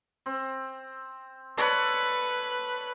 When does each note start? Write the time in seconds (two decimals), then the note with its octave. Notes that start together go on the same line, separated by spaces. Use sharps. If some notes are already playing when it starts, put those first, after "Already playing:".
0.26 C4
1.57 A4 B4 C#5 D5